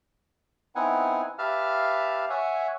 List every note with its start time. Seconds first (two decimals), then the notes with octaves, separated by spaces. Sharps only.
0.75 B3 C4 D#4 E4 F#5 G#5
1.39 G4 B4 E5 F5 A5 F6
2.30 C#5 E5 F#5 G#5